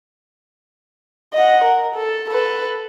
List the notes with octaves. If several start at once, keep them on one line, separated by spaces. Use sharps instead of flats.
D#5 F#5
A#4
A4
A4 B4